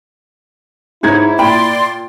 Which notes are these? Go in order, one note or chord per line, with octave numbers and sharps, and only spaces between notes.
G#2 D#4 E4 C#5 G#6
A#2 D5 G5 B5 C6